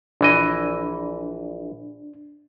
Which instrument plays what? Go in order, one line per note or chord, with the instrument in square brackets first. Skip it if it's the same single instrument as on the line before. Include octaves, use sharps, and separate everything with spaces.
[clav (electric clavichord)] A#1 E3 D#5 [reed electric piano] D4